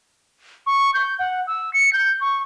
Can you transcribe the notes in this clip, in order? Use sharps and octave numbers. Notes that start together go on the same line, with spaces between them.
C#6
G6
F#5
E6
C#7
G6
C#6